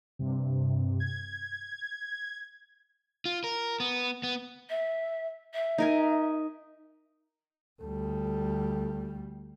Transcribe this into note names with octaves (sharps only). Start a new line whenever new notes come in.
G2 C3
G#6
F4
A#4
B3
B3
E5
E5
D#4 A#4 G#5
D2 G3 A4